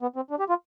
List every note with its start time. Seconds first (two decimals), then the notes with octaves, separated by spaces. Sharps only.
0.02 B3
0.16 C4
0.30 D4
0.39 G4
0.49 F4